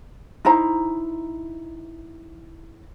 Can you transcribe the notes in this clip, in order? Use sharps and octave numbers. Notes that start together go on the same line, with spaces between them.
D#4 E4 C5 A#5